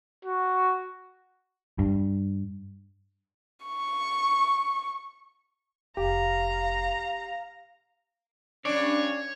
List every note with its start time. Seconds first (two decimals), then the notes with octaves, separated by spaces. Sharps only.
0.25 F#4
1.79 G2
3.66 C#6
5.97 F1 G4 F5 A#5
8.65 G2 C#4 D4 C#5 D5